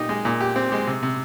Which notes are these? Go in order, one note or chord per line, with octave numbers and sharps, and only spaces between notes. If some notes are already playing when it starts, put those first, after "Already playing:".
Already playing: A#2 D#4 G4
G#3
A#2
G4
C4
G#3
C3
C3